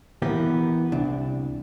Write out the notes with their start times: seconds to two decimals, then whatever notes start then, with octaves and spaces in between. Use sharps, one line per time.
0.22 E3 A#3 B3 G4
0.92 C2 D4